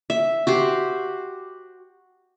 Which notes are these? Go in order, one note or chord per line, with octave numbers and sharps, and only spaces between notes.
E5
F#4 G4 C5